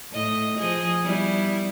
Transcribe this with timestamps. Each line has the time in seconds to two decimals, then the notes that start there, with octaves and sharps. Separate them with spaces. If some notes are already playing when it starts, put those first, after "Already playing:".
0.12 A2 D#5
0.58 F3 G#4 D#5
1.04 G3 B3 E4